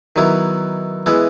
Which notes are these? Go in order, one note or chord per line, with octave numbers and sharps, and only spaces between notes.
D#3 F#3 B3 E4
E3 G#3 B3 E4